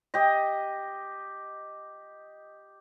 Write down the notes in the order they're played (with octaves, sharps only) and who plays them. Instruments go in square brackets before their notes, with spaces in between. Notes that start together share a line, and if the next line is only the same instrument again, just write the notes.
[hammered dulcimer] G4 D#5